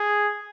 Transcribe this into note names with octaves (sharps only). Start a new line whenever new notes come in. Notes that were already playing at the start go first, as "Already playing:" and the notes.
Already playing: G#4